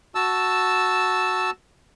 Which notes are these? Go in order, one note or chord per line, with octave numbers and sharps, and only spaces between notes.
F#4 A5 E6